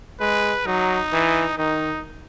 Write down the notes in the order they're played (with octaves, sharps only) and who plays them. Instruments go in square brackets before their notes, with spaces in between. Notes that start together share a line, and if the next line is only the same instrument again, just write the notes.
[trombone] G#3 [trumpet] B4
[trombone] F#3 [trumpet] D#4
[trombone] E3
[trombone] D#3 [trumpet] D#4